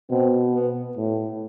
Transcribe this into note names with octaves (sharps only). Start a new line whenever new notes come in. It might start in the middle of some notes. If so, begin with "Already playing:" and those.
B2 C4
B3
A2